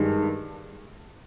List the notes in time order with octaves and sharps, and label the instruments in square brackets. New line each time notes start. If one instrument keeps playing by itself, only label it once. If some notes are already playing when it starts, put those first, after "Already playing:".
Already playing: [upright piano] G2 D#3 G#3